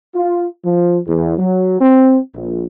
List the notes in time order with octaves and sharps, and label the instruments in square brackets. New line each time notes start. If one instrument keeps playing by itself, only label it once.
[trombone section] F4
F3
E2
F#3
C4
A#1